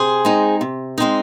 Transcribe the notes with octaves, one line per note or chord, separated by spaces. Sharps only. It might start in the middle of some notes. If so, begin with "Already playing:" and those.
Already playing: C3 G#4 C5
G#3 C4 D#4
C3
G#3 C4 D#4